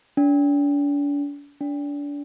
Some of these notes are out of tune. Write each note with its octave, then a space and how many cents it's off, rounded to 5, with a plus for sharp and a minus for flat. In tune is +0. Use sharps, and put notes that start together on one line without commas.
D4 -40
D4 -30